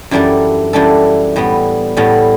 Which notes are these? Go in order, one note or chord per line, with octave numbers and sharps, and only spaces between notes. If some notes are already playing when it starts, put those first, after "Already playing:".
F#2 E3 G3 D4 A4
F#2 E3 G3 D4 A4
A2 G3 B3
A2 G3 B3